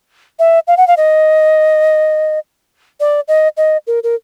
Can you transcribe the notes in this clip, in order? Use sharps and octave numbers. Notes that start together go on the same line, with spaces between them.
E5
F5
F#5
F5
D#5
D5
D#5
D#5
A#4
A#4